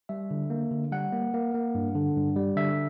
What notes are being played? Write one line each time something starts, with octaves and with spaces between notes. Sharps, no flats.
G3 E5
D3
A#3
D3
G3 F#5
A#3
A#3
A#3
G2
D3
G2
G3
D3 E5